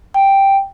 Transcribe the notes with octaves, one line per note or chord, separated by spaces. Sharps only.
G5